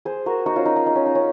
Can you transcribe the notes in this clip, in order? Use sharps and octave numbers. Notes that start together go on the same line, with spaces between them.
G#4 C5
F#4 A#4
D#4 F#4
C#4 F4
D#4
D#4
D#4
C#4
D#4
C#4